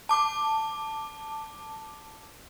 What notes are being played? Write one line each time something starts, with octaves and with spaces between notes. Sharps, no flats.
A5 D6